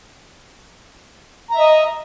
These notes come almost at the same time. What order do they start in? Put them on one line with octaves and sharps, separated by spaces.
A#5 E5 D#5